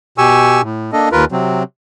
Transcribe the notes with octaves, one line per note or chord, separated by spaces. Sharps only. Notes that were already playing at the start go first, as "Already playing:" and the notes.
B2 G4 G#5 C#6 E6
A2
A#3 D4 A4 D#5
D#2 F4 A#4 B4
C3 F#3 C4